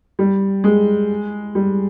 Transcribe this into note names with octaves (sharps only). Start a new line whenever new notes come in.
G3
G#3
G3